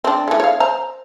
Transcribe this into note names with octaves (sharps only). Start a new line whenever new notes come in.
C4 D4
E3 A3
C#5 F5
C5 A#5